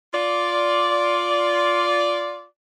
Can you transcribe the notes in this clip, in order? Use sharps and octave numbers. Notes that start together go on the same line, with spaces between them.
F4 D5